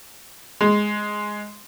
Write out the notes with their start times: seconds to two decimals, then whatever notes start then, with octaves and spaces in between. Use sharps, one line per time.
0.61 G#3